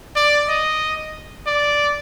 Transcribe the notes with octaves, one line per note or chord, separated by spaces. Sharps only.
D5
D#5
D5